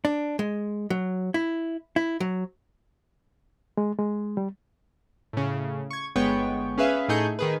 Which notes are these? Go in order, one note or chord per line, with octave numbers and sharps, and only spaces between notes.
D4
G#3
F#3
E4
E4
F#3
G#3
G#3
G3
A2 C#3
C#6 G#6
G1 G#3 B3 C#5 G5 C#6
C#4 G#4 B4 E5 F5
A2 A3 D#4 G#4 G6 C#7
D#3 G#4 B4